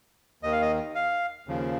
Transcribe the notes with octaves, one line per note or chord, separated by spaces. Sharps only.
D#2 D#3 D#5
F5
D#5
F5
D#2 C#3 F3